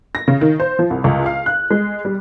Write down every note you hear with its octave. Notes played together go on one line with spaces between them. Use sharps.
A#6
C#3
D#3
C5
F3
C2
C#2
F5
F#6
G#3
G3